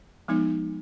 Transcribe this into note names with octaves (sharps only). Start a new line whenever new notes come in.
F3 G#3 B3 D#4